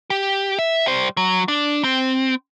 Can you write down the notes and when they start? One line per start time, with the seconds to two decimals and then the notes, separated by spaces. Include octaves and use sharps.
0.10 G4
0.59 E5
0.86 G3 C5
1.17 F#3
1.48 D4
1.84 C4